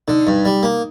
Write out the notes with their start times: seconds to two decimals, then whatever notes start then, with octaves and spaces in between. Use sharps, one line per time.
0.08 D3 D#4
0.27 G2
0.45 G3
0.63 A#3